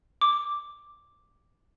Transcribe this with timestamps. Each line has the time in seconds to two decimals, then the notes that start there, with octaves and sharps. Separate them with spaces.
0.21 D6